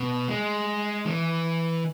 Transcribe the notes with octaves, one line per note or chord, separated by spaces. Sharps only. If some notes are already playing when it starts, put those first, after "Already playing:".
Already playing: B2
G#3
E3